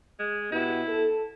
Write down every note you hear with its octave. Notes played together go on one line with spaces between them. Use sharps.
G#3
B2 B3 E4 G4
A4